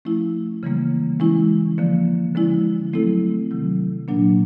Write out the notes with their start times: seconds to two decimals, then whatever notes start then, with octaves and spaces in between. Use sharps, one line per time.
0.05 F3 A3 C#4 E4
0.63 C#3 E3 G3 A#3
1.20 E3 G#3 C#4 E4
1.78 D3 F3 A#3
2.35 D3 F3 G#3 C#4 E4
2.93 F#3 A3 C4 E4 A4
3.51 C3 D#3 F#3
4.08 A#2 F#3 A#3 D4